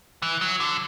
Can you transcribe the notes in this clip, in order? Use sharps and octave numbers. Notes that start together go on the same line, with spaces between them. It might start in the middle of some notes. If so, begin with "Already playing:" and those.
E3
F#3
D3